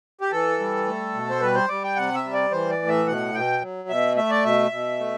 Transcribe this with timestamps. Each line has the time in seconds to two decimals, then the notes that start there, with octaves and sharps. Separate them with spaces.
0.21 G4
0.31 E3 A4
0.60 G3
0.86 A3
1.14 B2
1.30 C5
1.41 G3 B4
1.55 C5
1.69 G3 D5
1.83 G5
1.96 C3 F#5
2.15 E5
2.24 G3
2.33 D5
2.51 E3 C5
2.70 D5
2.79 A2
2.88 E5
3.07 B2 F#5
3.34 B2 G5
3.61 F#3
3.89 B2 E5
4.16 A3 E5
4.30 D5
4.45 B2 E5
4.71 B2
4.99 A3